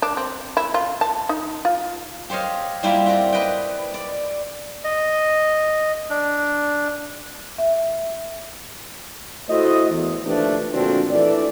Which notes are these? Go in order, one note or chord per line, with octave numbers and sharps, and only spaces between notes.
D4
C4
E4
F4
A5
D#4
F4
G4 C5 C#5 D#5 F5
G3 A#3 E4 F4 G4 E5
C4 F#4 G4 D5 A#5
B4 D#5 G5
D5
D#5
D4
E5
A3 E4 F#4 C5 D#5
E2
D#2 F3 A3 D4 G4 B4
A#2 D3 F3 C4 D4 F#4
E3 A3 D4 D5